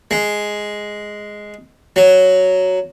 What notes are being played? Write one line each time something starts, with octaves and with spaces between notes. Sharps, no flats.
G#3
F#3